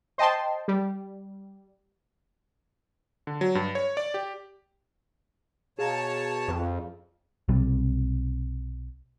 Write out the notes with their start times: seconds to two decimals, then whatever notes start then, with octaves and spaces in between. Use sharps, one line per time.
0.18 C5 D#5 G5 A5 C6
0.68 G3
3.27 D3
3.41 F#3
3.55 G2
3.75 C#5
3.97 D5
4.14 G4
5.79 B2 G#4 C#5 F5 A5 A#5
6.48 F2
7.49 B1 C3 G3